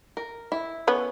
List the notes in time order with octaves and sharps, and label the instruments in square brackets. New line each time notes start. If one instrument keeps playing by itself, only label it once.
[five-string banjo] A#4
E4
[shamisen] B3 [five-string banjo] C#4